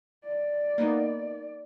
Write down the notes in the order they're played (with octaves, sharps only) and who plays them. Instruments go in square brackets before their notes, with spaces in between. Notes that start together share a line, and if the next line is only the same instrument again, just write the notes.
[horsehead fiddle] D5
[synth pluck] A#3 B3 D#4